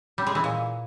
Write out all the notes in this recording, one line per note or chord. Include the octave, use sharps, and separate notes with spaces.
G3
G#3
E3
A#2